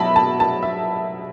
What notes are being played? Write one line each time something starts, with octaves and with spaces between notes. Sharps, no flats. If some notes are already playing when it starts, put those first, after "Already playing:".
Already playing: B2 F#3 E5 A5 B5
A5
A5
E5